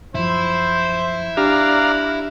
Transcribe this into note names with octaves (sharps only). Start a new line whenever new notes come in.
F#2 F3 E4 C5
D4 G4 D5 E5 F5 A#5 F#6